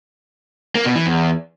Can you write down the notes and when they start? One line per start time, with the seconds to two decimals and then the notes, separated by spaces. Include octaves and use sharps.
0.75 A#3
0.85 B2
0.96 E3
1.06 E2